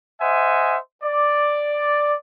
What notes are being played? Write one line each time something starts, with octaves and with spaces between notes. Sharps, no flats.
C5 D#5 E5 F#5 G#5
D5